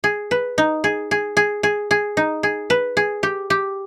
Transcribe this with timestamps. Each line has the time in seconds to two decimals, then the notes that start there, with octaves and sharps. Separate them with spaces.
0.04 G#4
0.31 B4
0.58 D#4
0.84 G#4
1.11 G#4
1.37 G#4
1.63 G#4
1.91 G#4
2.17 D#4
2.43 G#4
2.70 B4
2.97 G#4
3.23 G4
3.50 G4